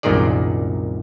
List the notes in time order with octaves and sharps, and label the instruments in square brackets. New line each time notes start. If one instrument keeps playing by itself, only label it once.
[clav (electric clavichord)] C2 F#2 A#2 D#3 G#4 D5